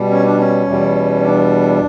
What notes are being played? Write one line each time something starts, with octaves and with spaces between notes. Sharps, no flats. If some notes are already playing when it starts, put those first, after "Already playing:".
Already playing: B2 G3
C#4
D4
C#4
E2 B2 G3
D4